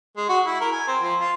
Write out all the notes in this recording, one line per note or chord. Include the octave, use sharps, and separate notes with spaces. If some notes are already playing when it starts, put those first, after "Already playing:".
G#3
F#4
E4
A#4
G#5
C4
F3
F4